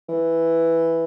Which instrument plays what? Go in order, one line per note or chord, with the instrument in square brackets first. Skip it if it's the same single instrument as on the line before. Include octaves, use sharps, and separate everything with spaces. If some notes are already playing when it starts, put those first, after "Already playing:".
[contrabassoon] E3